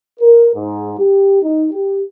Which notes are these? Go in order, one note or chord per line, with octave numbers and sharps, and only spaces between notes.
A#4
G#2
G4
D#4
G4